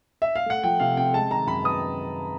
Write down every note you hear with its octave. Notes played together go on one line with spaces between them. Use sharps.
E5
F5
A3 F#5
F3 G5
C3 F5
C4 G5
G#3 A5
D#3 A#5
F#2 B5
B3 D#6